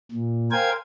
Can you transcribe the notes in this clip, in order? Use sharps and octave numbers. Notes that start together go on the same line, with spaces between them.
A#2
A#4 C5 F5 G5 G#5 G#6